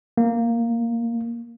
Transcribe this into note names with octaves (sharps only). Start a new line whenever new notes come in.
A#3